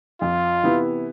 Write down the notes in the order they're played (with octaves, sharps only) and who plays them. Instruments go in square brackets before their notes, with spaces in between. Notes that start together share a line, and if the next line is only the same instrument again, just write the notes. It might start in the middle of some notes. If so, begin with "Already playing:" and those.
[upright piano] F2 [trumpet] F4
[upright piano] C3 E3 B3 E4